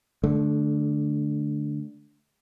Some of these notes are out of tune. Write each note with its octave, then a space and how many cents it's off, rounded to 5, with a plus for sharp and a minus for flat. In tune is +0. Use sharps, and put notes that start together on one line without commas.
D3 -5 A3 -25